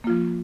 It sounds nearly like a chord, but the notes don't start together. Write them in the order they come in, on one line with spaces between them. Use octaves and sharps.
A#3 F4 F3